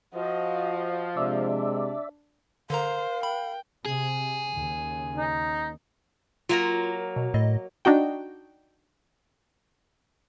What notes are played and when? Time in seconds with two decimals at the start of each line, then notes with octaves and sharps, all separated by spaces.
0.14 F3 F#4 D#5
1.17 C3 G#3 D4 D5 E5
2.70 D3 A#4 C5 F5 A#5
3.23 G5 B5
3.86 C3 G#4
4.56 D#2 C#3
5.17 D#4
6.49 F#3 A#3 F4 A#4
7.16 B2
7.34 A2 D#5
7.85 D4 D#4 F#4 G5